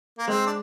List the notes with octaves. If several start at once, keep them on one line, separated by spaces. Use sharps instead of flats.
A#3
G#3 C4
D4